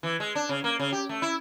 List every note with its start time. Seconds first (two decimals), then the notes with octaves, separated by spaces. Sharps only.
0.03 E3
0.20 G#3
0.35 D4
0.49 C#3
0.64 A#3
0.80 C#3
0.92 G4
1.09 A3
1.22 E4